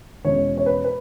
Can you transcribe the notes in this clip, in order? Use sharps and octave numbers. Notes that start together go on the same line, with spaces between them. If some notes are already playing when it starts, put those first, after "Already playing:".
E2 B2 G#3 C#4 C#5
C#5
B4
B4